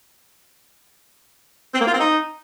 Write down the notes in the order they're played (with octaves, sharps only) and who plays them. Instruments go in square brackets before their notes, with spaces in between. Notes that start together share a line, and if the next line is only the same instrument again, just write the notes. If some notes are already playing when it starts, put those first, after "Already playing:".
[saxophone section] C4
A#3
F4
C4
D#4